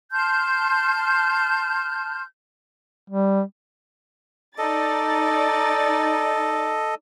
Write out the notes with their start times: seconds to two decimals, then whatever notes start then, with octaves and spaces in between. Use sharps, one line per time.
0.12 A5 C6 F6 G6
3.10 G3
4.58 D#4 A4 D5 D#5 A6